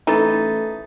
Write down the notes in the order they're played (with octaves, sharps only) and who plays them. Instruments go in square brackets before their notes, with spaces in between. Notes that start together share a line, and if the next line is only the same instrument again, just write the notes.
[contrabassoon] A1 [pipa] E3 [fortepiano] D#4 [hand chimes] A4 A6